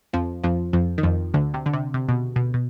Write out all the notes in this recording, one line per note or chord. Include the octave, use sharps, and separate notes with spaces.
F2 F3
F2 F3
F2 F3
D#3
F2 F3
D2 D3
C3
D3
C3
C3
B2
B2
B2